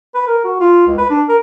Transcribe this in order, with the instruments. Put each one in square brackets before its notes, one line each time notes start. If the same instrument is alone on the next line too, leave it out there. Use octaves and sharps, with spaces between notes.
[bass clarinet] B4
A#4
F#4
F4
C#2
B4
D4
A#4